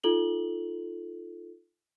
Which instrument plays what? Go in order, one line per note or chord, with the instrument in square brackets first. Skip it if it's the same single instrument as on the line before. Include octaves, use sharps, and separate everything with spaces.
[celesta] D#4 F4 A4 F#7 G7